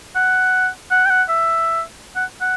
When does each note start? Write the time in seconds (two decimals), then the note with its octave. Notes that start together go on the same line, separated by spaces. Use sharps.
0.15 F#5
0.91 F#5
1.06 G5
1.10 F#5
1.29 E5
2.16 F#5
2.41 F#5